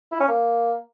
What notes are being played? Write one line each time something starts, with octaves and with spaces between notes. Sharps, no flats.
E4
C#4
A#3